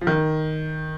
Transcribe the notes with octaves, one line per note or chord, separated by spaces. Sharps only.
F3
D#3